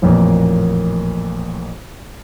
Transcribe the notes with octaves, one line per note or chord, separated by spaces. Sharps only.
A1 F2 A#2 A#3